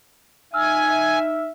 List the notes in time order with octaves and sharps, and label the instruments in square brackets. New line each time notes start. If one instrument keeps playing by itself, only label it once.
[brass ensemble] D#4 E5 [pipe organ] G#5 [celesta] E6 F6